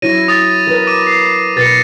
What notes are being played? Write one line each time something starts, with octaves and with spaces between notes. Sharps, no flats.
F#3 E4 C#5 A#6 D#7
D#6 A6
A#4 B4
D6 D#7 E7
D6 C7
B2 B4 A6 A#6 C#7